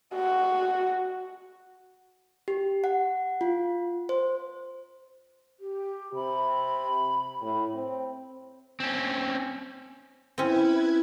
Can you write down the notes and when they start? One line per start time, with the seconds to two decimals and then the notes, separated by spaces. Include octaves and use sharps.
0.14 F#4
2.48 G4
2.84 F#5
3.41 F4
4.09 C5
5.60 G4
6.15 C3 B5
7.41 A2
7.74 C4
8.80 C4 C#4
10.38 C4 C#4 E4 B4 G#6